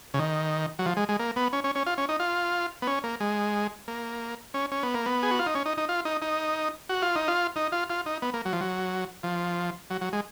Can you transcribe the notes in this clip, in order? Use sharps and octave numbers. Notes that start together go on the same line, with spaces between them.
C#3
D#3
F#3
F3
G#3
G#3
A#3
B3
C#4
C#4
C#4
F4
C#4
D#4
F4
B3
C#4
A#3
G#3
A#3
C#4
C#4
B3
A#3
B3
G#4
F#4
F4
D#4
C#4
D#4
D#4
F4
D#4
D#4
F#4
F4
D#4
F4
D#4
F4
F4
D#4
B3
A#3
F#3
F3
F#3
F3
F#3
F#3
G#3